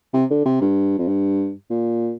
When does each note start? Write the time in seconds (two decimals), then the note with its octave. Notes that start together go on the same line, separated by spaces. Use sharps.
0.14 C3
0.30 D3
0.45 C3
0.61 G2
0.98 F2
1.08 G2
1.70 A#2